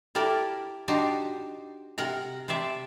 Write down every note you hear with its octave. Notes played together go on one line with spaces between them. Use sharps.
E4 G4 A4 A#4 D5
D4 D#4 F#4 G4 C5
C3 A#4 F#5 A#5
C3 C5 D5 E5 A5